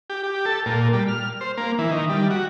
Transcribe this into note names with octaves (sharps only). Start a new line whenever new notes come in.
G4
G4
A4
A#2
G3
F6
C5
A#3
E3
D#3
G3
F#4